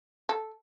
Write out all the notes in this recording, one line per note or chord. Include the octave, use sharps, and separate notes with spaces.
A4